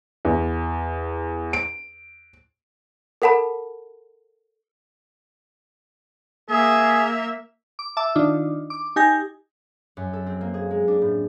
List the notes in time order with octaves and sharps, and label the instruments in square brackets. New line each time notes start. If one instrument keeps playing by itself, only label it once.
[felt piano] E2
D7
[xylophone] A4 A#4 F#5 A5 B5
[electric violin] A#3 E5 [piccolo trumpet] G#4
[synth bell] D6
E5 A5 D6 E6
D#3 D4 D#4 F4
D6
D#4 G4 G#5 G6 A#6
[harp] F#2
A4
C4
A#3
G#4
G#3
D4
A2